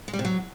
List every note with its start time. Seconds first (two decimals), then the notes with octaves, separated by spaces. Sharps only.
0.08 G#3
0.13 G3
0.19 C3
0.25 F#3